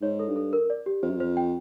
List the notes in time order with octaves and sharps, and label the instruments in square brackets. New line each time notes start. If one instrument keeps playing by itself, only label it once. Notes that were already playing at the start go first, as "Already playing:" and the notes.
[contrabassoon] G#2 [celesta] C#5
[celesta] A4
[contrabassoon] G2
[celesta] A4
A#4
D5
G4
[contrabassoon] F2 [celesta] C5
[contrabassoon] F#2
[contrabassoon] F2 [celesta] C5
[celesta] G5